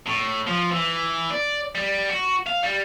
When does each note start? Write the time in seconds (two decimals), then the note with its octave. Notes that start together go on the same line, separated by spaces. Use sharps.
0.06 A2
0.47 F3
0.71 E3
1.30 D5
1.75 G3
2.10 F#4
2.47 F5
2.63 G3